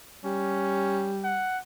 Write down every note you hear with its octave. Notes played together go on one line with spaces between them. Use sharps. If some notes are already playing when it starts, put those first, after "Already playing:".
G3 C#4
F#5